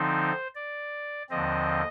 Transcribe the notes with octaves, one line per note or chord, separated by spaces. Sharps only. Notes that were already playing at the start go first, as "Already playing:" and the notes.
Already playing: D3 F3 C4 D#4 C5
D5
D#2 D3 F3 C4 D#5